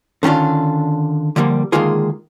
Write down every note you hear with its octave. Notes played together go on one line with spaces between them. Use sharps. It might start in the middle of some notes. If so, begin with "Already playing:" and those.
D3 D#3 C#4 D4 F4
D3 F3 G3 A#3
D3 D#3 G#3 A#3 F4 G#4